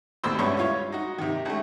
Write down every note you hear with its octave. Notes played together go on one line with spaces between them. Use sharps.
A1 D#2 B2 C4 C6 E6
C#2 G2 B3 C#4 E5 C#6
C#4 E4 F4 C#5
D#4 F#4
C3 D#3
C#2 A3